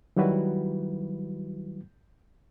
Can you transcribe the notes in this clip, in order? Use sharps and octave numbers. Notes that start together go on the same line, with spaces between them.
D#3 F#3 G3 E4 F#4 B4